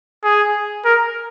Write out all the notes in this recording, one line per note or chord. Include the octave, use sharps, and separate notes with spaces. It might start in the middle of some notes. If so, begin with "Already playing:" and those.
G#4
A#4